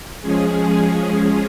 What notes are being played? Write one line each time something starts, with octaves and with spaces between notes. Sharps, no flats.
F3 G#3 C#4 G#4